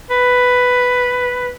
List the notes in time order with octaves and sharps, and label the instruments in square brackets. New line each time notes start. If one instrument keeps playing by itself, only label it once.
[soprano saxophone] B4